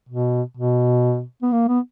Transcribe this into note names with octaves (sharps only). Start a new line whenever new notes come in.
B2
B2
B3
A#3
B3